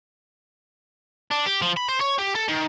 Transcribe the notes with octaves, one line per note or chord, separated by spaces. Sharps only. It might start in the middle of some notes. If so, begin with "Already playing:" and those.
D4
G4
F3
B5
C5
C#5
G4
A4
D#3